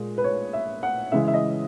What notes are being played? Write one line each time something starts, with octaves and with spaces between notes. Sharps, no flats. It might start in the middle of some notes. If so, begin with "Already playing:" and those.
Already playing: A#2 G#3
B4
C#5
E5
F#5
C#3 E3 G#3 E5
E5
D#5